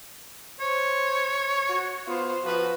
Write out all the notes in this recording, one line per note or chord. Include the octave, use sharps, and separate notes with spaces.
C5 C#5
F#4
B3 F4 C5
F3 F#4 B4